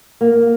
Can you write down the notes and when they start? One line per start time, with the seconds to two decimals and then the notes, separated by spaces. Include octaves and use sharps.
0.21 A#3